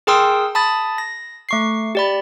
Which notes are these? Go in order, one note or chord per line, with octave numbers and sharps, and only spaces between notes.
G#4 A#4 G5 C6 D#6 E6
A5 B5 D#6 A6
A#6
A3 C#6 C7
G4 D5 B5